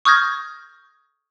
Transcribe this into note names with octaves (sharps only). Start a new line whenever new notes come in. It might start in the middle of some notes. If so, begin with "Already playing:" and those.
C#6 D#6 F6 G6 G#6 A#6